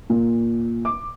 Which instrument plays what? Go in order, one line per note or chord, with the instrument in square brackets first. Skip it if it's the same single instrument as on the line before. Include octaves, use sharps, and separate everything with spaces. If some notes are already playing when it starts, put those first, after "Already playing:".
[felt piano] A#2
D6